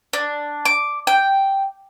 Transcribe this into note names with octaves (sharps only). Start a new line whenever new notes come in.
D4
D6
G5